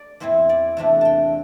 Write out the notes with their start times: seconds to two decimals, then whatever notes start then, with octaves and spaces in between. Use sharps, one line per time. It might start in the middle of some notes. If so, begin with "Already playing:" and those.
Already playing: D5
0.20 E2 E3 C4 E4 C5
0.49 D5
0.77 E2 C3 A3 D4 E5
1.01 G5 A5